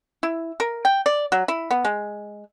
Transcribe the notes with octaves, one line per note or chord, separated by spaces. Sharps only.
E4
A#4
G5
D5
F#3
E4
B3
G#3